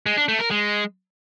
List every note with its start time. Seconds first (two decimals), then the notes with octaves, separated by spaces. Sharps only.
0.06 G#3
0.17 D4
0.28 A3
0.40 A#4
0.51 G#3